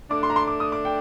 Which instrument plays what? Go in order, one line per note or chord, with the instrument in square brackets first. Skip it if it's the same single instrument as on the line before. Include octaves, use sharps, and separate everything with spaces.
[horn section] D3 A3 D4 [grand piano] D6
[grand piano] C6
A#5
C6
D6
D#6
D6
G5